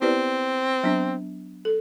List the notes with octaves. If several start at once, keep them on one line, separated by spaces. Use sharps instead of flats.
B3 C4 E4 G4 B4 D5
F#3 B3 D4
A4